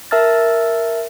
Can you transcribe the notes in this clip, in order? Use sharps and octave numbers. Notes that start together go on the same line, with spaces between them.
A#4 E5 A5 E6 F6 A6